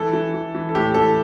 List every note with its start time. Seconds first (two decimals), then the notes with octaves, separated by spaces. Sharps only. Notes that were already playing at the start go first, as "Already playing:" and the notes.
Already playing: E3 A4
0.13 E3
0.34 E3
0.55 E3
0.69 A4
0.75 A2 G4
0.94 E3 A4